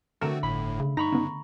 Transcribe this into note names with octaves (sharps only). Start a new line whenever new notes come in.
D3 A3 C4 F#4 A4 A#4 E7
G1 A2 B5
C#3
G2 D#4 A#5 B5 C#6 A#6
C#3 B3